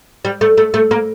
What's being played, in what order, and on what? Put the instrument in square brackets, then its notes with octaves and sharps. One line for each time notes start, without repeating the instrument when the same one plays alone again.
[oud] G3
A3
A3
A3
A#3